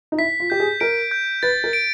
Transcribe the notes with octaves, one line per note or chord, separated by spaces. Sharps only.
D#4
E4 B6
F4
G4 G6
G#4
A#4 D7
G6
B4 A6
A#4
D7